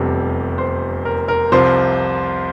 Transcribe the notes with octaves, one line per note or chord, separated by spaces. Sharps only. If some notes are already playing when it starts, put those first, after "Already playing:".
Already playing: F1 E2 C3 G3 D4 A4
C5
A#4
A#4
C2 C3 F3 C5